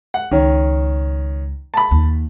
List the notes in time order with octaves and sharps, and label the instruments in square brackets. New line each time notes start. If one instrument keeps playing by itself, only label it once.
[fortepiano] F#5
[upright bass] C#2 [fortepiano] D#3 C#4
[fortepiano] A5 B5
[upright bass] D#2